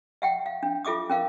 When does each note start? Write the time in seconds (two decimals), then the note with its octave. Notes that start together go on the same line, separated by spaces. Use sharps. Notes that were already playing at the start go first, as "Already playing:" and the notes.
0.22 E5 F#5 G5
0.46 F5
0.63 D4
0.85 F4 A4 E5 D6 D#6
1.10 C#4 A#4 F5